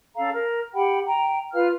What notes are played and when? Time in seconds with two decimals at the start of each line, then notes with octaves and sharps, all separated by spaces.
0.16 C#4 A4 F5 A#5
0.32 A#4
0.74 G4 F#5 G5 B5
1.06 G5 A#5
1.54 F4 B4 F5 F6